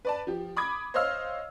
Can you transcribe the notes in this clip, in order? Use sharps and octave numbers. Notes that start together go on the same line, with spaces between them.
B4 D5 A5
F3 G4
B5 D6 D#6 G#6
C5 C#5 D#5 F5 E6 F6